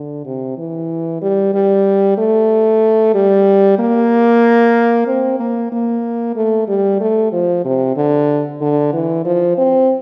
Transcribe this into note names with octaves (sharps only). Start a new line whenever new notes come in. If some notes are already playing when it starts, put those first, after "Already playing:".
Already playing: D3
C3
E3
G3
G3
A3
G3
A#3
C4
A#3
A#3
A3
G3
A3
F3
C3
D3
D3
E3
F3
C4